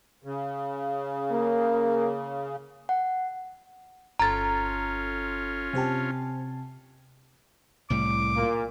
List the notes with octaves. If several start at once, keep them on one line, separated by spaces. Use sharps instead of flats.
C#3
A#3
F#5
G1 C#4 F4 A4 A#5 C6 A6
C3 G4 C5 G#5 A5
C2 A2 G3 D6
A#2 A#3